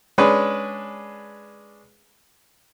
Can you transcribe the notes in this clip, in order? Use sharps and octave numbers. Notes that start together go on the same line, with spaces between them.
G#3 C#4 D4 G#4 B4